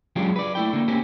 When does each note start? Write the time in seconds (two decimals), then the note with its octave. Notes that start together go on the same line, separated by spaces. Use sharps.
0.16 F#3 G#3 C#4 D4 F4 G4
0.36 B4 D5
0.55 A3 E4 G5
0.73 D3 A#3
0.88 A#3 C4 C#4 G4